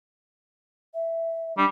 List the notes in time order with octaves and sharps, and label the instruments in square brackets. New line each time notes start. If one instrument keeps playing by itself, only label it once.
[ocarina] E5
[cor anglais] G3 [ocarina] D4